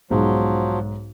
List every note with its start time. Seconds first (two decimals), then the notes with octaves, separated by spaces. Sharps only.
0.10 B1 G#2 F3 F#3